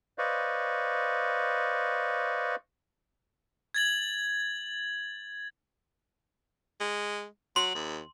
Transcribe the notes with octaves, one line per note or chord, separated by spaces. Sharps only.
B4 C5 D5 D#5 F5 C#6
G#6 A6 F#7
G#3
F#3 C6
D#2